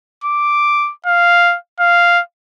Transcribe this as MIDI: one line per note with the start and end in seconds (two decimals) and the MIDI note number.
0.24 0.91 86
1.07 1.56 77
1.80 2.21 77